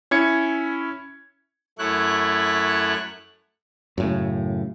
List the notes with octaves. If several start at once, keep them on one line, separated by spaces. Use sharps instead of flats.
C#4 E4 G#6 C#7
F#2 A3 E4 C#5 F#6
F#2 A2 C#3